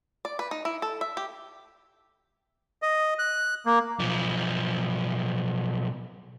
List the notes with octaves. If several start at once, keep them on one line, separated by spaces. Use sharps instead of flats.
D5
B4
D#4
E4
A4
E5
G4
D#5
F#6
A#3
B1 F3